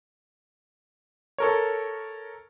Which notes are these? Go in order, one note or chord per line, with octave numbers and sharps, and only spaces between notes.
A4 A#4 C#5